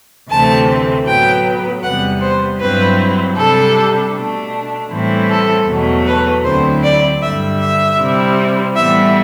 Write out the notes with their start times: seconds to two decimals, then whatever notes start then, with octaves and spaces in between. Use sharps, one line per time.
0.29 D2 C3 E3 A3 C4 A5
1.06 A2 F#3 B3 G5
1.83 E2 C3 G3 B3 F#5
2.21 C5
2.60 G2 F#3 C4 E4 B4
3.36 C3 G3 D4 A4
4.13 B2 A3 D4
4.90 A2 E3 G3 C4 E4
5.29 A4
5.67 E2 B2 F#3 A3
6.06 B4
6.44 D2 D3 F#3 C4 E4 C5
6.83 D5
7.22 G2 D3 G3 E5
7.59 E5
7.97 C3 G3 C4 E4
8.75 A2 E3 G3 B3 E4 E5